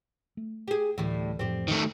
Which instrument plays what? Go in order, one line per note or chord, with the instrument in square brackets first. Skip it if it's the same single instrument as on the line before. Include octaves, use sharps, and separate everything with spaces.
[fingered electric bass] A3
[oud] G4 G#4
[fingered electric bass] D2 E3 [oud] A2 G3
[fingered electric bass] F2 A2 F3 [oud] C4 G4
[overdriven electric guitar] D#3 A3